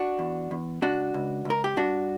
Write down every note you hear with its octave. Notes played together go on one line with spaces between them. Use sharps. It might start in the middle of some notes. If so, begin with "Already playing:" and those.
Already playing: D4 F#4
E2
E2
C#2 D4 F#4
C#2
C#2 A#4
G4
G2 D4 F#4